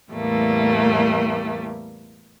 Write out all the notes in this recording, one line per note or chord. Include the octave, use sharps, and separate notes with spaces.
E2 A2 G3 A3 A#3